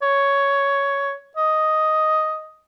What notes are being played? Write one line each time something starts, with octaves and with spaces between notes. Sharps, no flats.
C#5
D#5